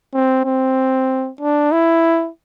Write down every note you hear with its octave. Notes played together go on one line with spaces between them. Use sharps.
C4
C4
D4
E4